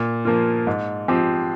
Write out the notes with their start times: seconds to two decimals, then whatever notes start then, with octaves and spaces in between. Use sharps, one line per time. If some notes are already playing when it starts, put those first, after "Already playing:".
Already playing: A#2
0.25 F3 A#3 F4
0.67 G#2
1.08 F3 C4 G4